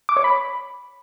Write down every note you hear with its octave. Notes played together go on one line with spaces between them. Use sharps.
D6
C#5
B5